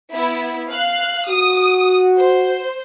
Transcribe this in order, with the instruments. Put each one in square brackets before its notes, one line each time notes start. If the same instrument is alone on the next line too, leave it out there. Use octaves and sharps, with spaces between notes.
[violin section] B3 E4
F5 F#6
[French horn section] F#4 [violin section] D#6
[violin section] C5